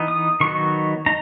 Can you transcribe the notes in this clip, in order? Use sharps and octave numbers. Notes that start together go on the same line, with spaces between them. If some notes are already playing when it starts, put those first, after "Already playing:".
Already playing: E3 B3 D#4
D#6
D#3 F#3 B3 D#4 C#6
D#4 A#5